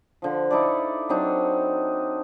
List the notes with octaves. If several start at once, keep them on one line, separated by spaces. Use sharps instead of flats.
D3 F3
D#4 E4 A4 D5
F#3 C4 D4 D#4